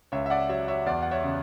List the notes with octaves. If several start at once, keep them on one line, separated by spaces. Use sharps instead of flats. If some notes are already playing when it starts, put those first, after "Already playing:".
C#2 C#5 E5
E5
D5 F#5
F#3 C#5 E5
C#5 E5
E2 D5 F#5
F#5
C#5 E5
C#3